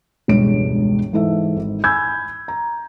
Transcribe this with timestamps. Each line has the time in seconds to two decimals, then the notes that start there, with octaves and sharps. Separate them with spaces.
0.28 E1 C#2 G2 D4 C#5 D7
1.13 G#2 E3 A4 E5
1.56 G#1
1.84 G#5 B5 E6 G6 G#6
2.48 A#5